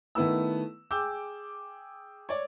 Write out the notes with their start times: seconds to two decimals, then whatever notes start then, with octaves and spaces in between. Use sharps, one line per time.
0.15 D#3 A3 B3 E4 B4 E6
0.91 G#4 G5 D6 E6 G6
2.29 C#5 D5